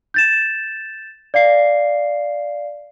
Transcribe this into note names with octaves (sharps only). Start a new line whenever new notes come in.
G6 A6 E7
D5 F5 C7